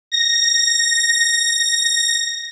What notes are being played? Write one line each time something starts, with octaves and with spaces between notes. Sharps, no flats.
A#6
A#6